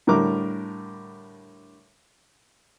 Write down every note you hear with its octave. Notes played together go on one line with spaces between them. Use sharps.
A2 D3 G3 A#4 D6